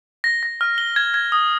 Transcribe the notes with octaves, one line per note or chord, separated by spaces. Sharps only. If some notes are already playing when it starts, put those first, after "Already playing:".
A#6
A#6
F6
G7
G#6
G#6
D#6